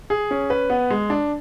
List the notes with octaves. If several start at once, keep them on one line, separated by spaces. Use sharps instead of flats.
G#4
C#4
B4
B3
G#3
D4